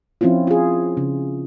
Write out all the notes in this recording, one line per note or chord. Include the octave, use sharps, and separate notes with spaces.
F3 C4 C#4 E4 F4
F4 G#4
C#3